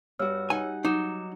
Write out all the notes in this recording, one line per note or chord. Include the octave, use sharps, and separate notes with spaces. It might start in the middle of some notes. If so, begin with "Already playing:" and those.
G2 F#4 C#5 E6 F6
D#4 F#5 G#5
F#3 D#4 D6 E7